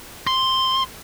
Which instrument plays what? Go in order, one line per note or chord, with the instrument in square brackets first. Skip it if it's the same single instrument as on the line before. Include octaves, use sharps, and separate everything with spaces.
[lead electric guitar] C6